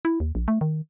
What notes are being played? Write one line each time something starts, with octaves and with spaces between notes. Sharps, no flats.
E4
D#2
A#1
A3
D#3